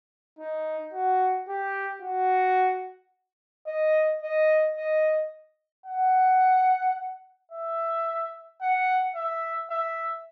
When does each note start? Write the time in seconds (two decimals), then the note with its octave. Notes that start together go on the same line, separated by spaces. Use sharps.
0.39 D#4
0.93 F#4
1.49 G4
2.02 F#4
3.67 D#5
4.22 D#5
4.76 D#5
5.86 F#5
7.51 E5
8.61 F#5
9.15 E5
9.70 E5